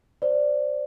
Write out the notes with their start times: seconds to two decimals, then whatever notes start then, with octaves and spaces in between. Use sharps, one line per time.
0.22 C5 D5